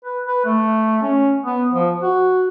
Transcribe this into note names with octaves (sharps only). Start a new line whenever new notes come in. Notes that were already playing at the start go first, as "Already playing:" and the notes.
B4
B4
A3
C#4
B3
F3
F#4